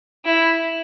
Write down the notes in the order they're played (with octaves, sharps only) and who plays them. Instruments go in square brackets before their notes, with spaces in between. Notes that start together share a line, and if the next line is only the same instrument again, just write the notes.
[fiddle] E4